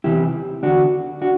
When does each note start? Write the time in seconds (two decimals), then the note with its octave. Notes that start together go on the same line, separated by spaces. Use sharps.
0.04 E2 C3 E3 E4 G4
0.63 E2 D3 D4 F#4
1.22 D4 F#4